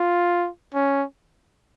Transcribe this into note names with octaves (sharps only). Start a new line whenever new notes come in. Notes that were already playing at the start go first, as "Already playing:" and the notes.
Already playing: F4
C#4